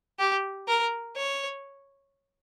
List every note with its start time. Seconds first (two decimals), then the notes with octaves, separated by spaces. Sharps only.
0.19 G4
0.68 A#4
1.16 C#5